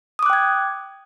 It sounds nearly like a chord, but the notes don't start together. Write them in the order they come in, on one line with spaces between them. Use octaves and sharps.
D#6 D6 F#6 G5 G#6